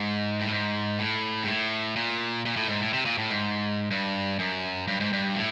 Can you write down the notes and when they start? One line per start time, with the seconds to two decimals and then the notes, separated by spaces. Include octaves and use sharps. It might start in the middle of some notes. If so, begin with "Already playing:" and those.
Already playing: G#2
0.41 A2
0.51 G#2
0.99 A2
1.44 G#2
1.48 A2
1.96 A#2
2.46 A#2
2.57 A2
2.68 G#2
2.80 A2
2.94 C3
3.06 A#2
3.18 A2
3.30 G#2
3.91 G2
4.39 F#2
4.88 G2
5.00 G#2
5.13 G2
5.36 A2